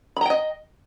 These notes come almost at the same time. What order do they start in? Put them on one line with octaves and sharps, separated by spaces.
B5 A#5 G5 D#5